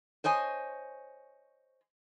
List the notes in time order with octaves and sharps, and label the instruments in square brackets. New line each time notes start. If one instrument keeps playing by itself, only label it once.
[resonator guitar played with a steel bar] C5 C#5 D#5 G#5